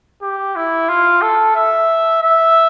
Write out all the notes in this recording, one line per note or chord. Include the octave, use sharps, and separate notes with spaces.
G4
E4
F4
A4
E5
E5